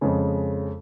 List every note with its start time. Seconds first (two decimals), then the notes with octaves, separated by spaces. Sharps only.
0.01 F2 C#3 G#3